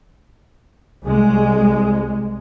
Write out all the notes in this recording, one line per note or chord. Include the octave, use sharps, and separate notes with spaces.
C2 G#3